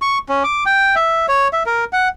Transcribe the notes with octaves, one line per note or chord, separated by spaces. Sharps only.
C#6
C#4
D6
G5
E5
C#5
E5
A#4
F#5